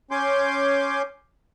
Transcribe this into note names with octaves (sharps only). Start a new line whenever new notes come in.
C#4 G#5 C6 D6 G6